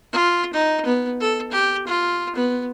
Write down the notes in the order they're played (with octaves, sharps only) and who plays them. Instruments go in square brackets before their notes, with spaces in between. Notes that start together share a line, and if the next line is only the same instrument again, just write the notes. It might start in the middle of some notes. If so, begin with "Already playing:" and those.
[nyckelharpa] F4
D#4
B3
A4
G4
F4
B3